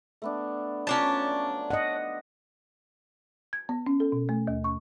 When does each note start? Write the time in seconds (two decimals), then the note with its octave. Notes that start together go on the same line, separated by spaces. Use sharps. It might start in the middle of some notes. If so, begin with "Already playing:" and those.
0.22 A3 B3 D4
0.87 F3 F#3 C#4 D4 A5
1.70 D#5 F#5
3.53 G#6
3.69 B3
3.87 C#4
4.00 A4
4.12 B2
4.29 A3
4.47 D#2
4.64 C#6